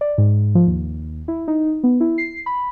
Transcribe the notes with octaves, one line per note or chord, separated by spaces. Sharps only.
D5
G#2
F3
D#2
E4
D#4
B3
E4
C7
B5